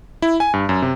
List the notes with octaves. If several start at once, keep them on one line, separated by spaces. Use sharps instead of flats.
E4
G#5
G2
F#2
C3